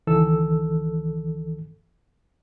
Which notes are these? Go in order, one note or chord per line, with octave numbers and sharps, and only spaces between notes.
C#2 D#3 E3 A4 E6